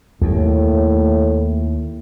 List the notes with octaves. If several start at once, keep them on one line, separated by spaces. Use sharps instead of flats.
D#2 A2